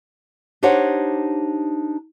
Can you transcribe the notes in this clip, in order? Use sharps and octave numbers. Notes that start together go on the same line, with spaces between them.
D4 D#4 G4 C5 C#5 F#5